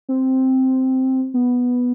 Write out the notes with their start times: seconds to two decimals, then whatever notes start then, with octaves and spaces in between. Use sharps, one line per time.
0.09 C4
1.34 B3